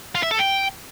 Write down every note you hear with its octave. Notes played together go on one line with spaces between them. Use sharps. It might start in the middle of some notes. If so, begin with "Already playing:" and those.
F4
E5
A4
G5